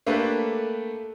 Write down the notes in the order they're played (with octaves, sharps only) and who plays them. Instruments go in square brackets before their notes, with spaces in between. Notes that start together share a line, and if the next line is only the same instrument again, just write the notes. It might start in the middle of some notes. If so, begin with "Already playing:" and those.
[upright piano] A3 A#3 D4 G4 A4 B4